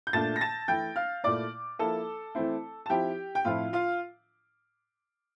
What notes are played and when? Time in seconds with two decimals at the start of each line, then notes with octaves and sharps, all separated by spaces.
0.07 G6
0.13 A#2 A3 D4 A5 A6
0.36 A#6
0.41 A5 A6
0.68 E3 A3 E4 G5 G6
0.96 F5 F6
1.24 A#2 A3 E4 D5 D6
1.79 F3 A#3 E4 A4 A5
2.35 E3 A3 C4 E4
2.86 A5
2.90 F3 C4 E4 G4 G5
3.35 G5
3.45 A2 F3 C4 E4 F4 F5
3.73 F4 F5